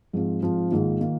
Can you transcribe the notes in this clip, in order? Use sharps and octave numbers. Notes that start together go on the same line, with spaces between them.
G#2 F3 C4 F4
G#2 F3 C4 F4
G#2 D#3 A#3 F4
D#3 A#3 F4